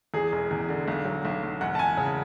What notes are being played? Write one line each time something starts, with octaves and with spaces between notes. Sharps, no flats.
E2 G#4
E1
E2
D3
B1
F#3
B1
B1
E1 F#5
A5
E1 G#5
C#3